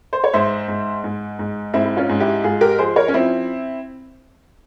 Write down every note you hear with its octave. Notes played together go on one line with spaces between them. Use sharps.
C5
C#5
G#2 C5 E5
G#2
G#2
G#2
G#2 C4 E4
E4
C#4 F4
G#2
E4 G4
G#2 F4 G#4
G4 A#4
F3 G#4 C5
A#4 C#5
C#4
F3 C4 E4